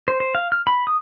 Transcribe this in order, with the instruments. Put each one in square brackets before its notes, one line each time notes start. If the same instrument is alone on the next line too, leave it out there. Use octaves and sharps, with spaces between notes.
[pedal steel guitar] C5
C5
F5
F6
B5
D#6